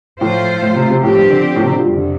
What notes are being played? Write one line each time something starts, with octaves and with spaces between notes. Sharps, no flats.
A2 F3 A3 F4 C5
A2
C3
C3
A2 F3 C4 G4
G2
D3
A2
C3
D3
F3
F2 C3 G3
D3